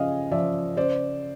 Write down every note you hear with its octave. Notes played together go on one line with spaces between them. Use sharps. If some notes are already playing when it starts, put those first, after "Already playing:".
Already playing: C#3 F3 D#5 F5 G#5
F3 D5 E5
C#3 C5 D5